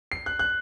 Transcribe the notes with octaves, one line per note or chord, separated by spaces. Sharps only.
C7
F#6
F#6